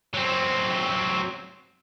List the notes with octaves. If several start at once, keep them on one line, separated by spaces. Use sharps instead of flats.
F#3 C4